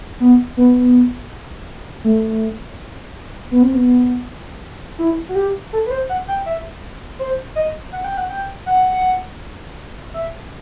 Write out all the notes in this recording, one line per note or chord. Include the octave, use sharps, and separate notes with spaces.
B3
B3
A3
B3
C4
B3
E4
F#4
G4
A4
B4
C5
F#5
G5
E5
C5
D#5
F#5
G5
F#5
G5
F#5
E5